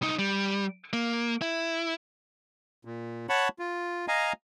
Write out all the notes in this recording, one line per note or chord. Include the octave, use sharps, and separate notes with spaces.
C2 D#4
G3
A#3
E4
A#2
C#5 F#5 A5 B5 C#6
F4
D#5 F5 G#5 A#5